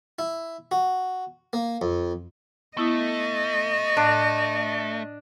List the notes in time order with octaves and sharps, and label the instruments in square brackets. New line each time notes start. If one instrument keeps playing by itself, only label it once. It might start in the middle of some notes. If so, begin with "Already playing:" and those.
[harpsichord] E4
F#4
A#3
F2
[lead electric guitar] A3 [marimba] B3 E4 D#6 [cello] D#5
[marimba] A2 F5 [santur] D4